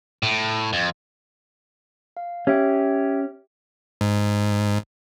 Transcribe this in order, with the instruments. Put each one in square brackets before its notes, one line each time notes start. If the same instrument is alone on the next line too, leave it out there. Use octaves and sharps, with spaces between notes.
[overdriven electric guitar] A2
F2
[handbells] F5
[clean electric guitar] C#4 [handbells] G4 E5 G5
[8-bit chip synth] G#2